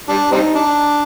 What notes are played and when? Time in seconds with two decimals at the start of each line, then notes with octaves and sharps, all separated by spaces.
0.09 G3 D4
0.32 G3 C4 D#4
0.55 D4